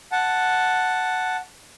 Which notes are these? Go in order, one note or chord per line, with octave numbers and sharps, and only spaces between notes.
F#5 A5